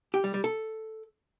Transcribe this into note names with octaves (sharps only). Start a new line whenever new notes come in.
G4
G3
G3
A4